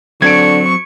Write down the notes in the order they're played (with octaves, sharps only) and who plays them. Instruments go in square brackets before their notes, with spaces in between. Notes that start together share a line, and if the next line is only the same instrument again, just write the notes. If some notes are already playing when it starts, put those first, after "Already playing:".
[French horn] D3 [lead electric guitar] F#3 C4 [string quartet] C#6 [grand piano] G#6 D7